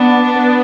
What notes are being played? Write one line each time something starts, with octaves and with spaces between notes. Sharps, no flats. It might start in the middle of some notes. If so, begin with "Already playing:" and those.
Already playing: B3 D4
B3